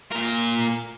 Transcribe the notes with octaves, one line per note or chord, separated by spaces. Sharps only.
A#2 A#4